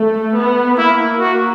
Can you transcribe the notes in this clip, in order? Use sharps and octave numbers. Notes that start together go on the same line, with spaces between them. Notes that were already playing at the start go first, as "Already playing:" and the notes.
Already playing: A3
B3
A#3 E4
F#4